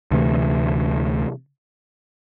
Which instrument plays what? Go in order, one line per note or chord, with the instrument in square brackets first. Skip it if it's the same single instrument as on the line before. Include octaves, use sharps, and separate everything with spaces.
[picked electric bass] D2 C3 E3 A3